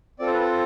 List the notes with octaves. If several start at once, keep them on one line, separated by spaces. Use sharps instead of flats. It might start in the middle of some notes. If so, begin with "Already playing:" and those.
C4 F4 A4 D5
C5
B4
C5